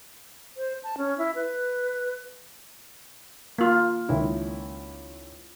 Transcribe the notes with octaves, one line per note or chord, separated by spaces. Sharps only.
C5
A5
C#4
E4
B4
A#3 F4
C#2 D#3 E4